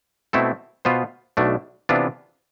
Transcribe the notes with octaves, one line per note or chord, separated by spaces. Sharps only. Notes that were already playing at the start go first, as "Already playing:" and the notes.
B2 A3 C4 E4 A4
B2 B3 F4 C5
B1 B2 A3 D4
C3 E3 B3 D4 F4